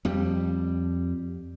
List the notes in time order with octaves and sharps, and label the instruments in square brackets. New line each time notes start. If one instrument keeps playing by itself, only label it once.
[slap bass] F2 G3